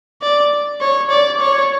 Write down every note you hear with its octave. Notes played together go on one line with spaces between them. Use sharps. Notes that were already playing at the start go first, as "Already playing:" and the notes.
D5
C#5
D5
C#5